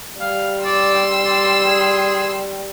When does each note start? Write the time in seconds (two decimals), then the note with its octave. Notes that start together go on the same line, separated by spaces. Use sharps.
0.20 G3 F5
0.64 D5 C6 E6
1.24 D5
1.67 G#4